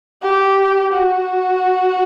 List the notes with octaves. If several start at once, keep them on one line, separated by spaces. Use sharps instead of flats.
G4
F#4